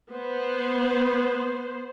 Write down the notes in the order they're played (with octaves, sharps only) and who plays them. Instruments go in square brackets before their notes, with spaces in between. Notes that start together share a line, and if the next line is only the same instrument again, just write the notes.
[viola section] B3 C5